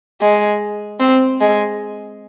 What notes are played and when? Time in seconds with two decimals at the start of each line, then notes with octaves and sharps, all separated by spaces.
0.22 G#3
1.00 C4
1.41 G#3